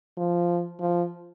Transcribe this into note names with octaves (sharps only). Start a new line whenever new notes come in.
F3
F3